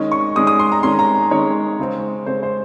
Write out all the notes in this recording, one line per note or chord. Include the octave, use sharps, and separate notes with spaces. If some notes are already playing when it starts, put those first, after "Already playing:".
Already playing: D#3 G#3 C#4 D#5
C#6
D#3 G#3 C#4 D#6
D#6
C6
A#5
D#3 G#3 C#4 C6
A#5
D#3 G#3 C#4 C#5
C#3 G#3 C4
C#3 G#3 C4 C5
C5